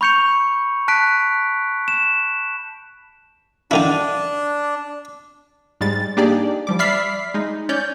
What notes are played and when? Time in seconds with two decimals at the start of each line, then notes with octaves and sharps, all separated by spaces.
0.01 B5 C#6 G6 C#7 F7
0.88 A5 F#6 B6 D7
1.88 E7
3.71 D3 D#3 D4 E4
5.81 G#2 G3 G#3 A6
6.17 A#3 D4 D#4 G4 G#4 D5
6.67 F3 G3 D6
6.79 D5 E5 B5 F6 B6 C7
7.34 G#3 D#4
7.69 C#4 C#5 D5 G6